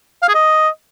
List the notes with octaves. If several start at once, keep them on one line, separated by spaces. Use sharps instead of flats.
F5
G#4
D#5